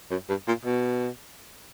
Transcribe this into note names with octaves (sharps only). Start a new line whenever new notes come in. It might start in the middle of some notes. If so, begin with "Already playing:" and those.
F#2
G2
A#2
B2